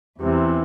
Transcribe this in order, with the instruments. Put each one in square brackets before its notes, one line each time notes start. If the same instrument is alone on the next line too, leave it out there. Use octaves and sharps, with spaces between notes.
[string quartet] E2 C3 E3